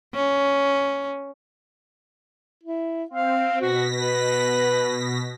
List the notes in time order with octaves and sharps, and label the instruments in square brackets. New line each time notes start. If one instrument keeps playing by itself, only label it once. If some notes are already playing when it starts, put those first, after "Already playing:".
[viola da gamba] C#4
[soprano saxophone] E4
[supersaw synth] C4 [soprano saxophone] F5
[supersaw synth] B2 A#6 B6 [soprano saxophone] F#4
[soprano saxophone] B4